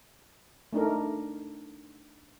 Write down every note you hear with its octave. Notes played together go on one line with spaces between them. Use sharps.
A3 D4 D#4 A#4